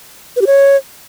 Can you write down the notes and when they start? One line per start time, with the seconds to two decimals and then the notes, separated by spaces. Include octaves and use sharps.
0.36 B4
0.42 G4
0.47 C#5